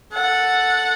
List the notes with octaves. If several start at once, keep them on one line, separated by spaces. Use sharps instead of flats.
A4 F#5